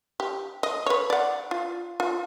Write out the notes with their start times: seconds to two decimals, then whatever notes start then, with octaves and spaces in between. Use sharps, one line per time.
0.20 G4
0.63 D#5
0.86 B4 C#5
1.10 D5 F#5
1.51 F4
2.00 F4